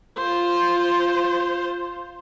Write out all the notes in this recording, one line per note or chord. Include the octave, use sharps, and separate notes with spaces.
F4 C5